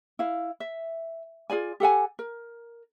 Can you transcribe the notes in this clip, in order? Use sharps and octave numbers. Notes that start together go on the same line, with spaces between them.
E4 F5
E5
F4 G#4 D5 G#5
G4 A4 F#5 G#5
A#4